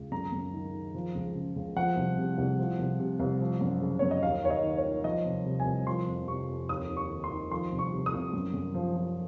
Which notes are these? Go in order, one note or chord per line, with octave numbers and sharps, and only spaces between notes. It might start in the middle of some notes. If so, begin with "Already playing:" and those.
Already playing: C#2
F#2 A#5
F#2
D#3
D#3
F3
C#2
C#3
C#2
F3 F#5
C2
C3
C2
F3
C2
C3
C2
F3
F#2
C#3
F#2 C#5
D#5
D#2 F5
D#2 C#5
D#5
D#3
C#5
D#3
F3 D#5
C2
C3
G#5
C2
F3 C6
F2
C3 C#6
F2
D#2 D#6
D#2
C#6
D#3
C6
D#3
F3 C6
C2
C#6
C3
D#6
C2
F#2
F#2
F3
F3